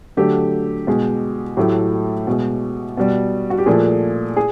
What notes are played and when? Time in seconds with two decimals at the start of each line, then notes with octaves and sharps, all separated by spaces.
0.17 D3 F#3 A3 G4
0.87 B2 G#3
1.57 A2 F#3 A3 G4
2.27 B2 G#3
2.97 B2 G3
3.50 F#4
3.58 G4
3.66 A#2 F3 A3 G#4
4.37 G#4